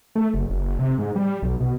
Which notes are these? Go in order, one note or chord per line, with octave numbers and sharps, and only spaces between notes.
A3
F#1
F#1
C3
G#2
G3
B1
B2